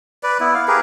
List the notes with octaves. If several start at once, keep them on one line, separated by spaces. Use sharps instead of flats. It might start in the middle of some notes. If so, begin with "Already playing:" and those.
B4 D5
B3 E4
F5
G4 G#4 A#4 B4